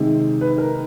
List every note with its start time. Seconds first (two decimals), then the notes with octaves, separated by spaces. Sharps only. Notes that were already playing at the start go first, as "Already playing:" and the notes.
Already playing: C3 D#3 G#3
0.41 B4
0.58 A#4